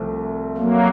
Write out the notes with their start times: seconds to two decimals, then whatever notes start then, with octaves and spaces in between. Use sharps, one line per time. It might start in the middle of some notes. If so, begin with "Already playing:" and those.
Already playing: C2 C3 F3 A3
0.57 F#3 A#3